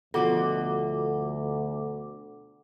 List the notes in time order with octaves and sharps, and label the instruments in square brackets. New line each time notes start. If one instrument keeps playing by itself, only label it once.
[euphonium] D2 [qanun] B2 F3 B5 [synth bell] A4 F#5 D6